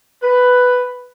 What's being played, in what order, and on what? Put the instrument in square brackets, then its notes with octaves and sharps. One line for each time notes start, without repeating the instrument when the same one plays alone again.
[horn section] B4